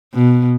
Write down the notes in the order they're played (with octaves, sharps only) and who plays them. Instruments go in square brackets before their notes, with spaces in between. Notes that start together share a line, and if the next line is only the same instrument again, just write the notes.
[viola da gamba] B2